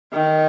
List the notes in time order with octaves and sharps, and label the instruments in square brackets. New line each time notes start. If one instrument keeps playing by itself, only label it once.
[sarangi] D#3